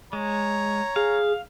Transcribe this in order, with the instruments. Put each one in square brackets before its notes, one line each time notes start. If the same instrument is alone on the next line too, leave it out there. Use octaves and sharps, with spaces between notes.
[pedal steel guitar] G#3 [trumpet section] C#5 A#5
[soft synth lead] G#4 [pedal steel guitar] F5